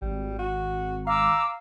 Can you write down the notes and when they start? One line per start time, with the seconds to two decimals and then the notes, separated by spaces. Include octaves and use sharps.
0.02 G#1 G3
0.39 F#4
1.07 F5 A#5 D6 E6